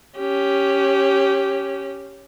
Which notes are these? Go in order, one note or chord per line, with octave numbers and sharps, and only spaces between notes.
C#4 G4